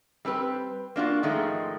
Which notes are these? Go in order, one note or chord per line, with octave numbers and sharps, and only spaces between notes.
G3 C4 G4 B4
A#3 D4 F4 F#4
G#2 D#3 F3 G#3 A3